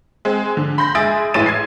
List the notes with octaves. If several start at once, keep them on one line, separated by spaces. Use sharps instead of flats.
G#3 C4
D3
B5 C6 G6 A#6
G#3 G#4 E5 D#6 A6 D7
A1 A2 G#3 C#5 A6 D#7
G#6 C7